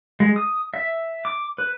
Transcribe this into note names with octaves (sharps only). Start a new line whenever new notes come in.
G#3
D#6
E5
D6
B4